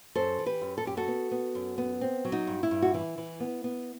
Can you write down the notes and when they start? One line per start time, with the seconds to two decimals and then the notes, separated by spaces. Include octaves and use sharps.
0.15 F#2 A4 C5
0.39 E3
0.46 G4 B4
0.61 F#2
0.78 A4
0.85 F#2 G4
0.97 F#4 A4
1.08 B3
1.31 B3
1.55 F#2
1.78 B3
2.01 C4
2.25 F#3
2.32 D#4 F#4
2.47 G2
2.63 E4
2.71 G2
2.82 F#4
2.94 E3 E4
3.18 E3
3.40 B3
3.64 B3